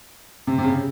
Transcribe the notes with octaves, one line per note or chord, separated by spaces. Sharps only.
C3
C3
C#3